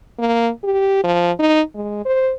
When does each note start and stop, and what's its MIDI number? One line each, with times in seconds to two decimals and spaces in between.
0.19 0.50 58
0.64 1.01 67
1.04 1.32 53
1.39 1.62 63
1.75 2.03 56
2.05 2.33 72